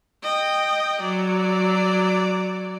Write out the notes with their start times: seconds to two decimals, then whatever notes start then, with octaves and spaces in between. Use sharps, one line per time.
0.23 D#5 G5
1.02 F#3 D5